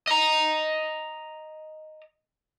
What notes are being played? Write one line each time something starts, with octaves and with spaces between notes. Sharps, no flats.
D#5 A#5